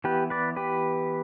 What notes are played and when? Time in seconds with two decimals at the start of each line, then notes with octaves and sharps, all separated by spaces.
0.04 E3 B3 G4 B4
0.30 B4 D5
0.56 G4 B4